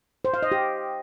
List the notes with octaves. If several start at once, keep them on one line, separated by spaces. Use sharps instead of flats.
C5
F5
D#5
G4